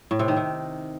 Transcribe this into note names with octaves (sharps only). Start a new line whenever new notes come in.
A2
C3
D#3
C3